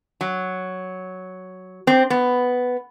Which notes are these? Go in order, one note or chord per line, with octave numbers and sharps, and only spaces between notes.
F#3
C4
B3